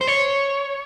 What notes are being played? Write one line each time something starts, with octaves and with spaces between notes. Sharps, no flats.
C5
C#5